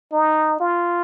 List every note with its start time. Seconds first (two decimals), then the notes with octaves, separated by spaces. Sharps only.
0.13 D#4
0.60 F4